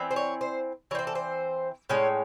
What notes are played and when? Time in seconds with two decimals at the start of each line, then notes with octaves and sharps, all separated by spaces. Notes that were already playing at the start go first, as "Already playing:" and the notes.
Already playing: E3 C4
0.11 C5
0.16 C#5
0.41 C5
0.91 E3 C#5
0.95 C4 C5
1.07 A4
1.15 C5
1.89 A2 G#3 C#4 C#5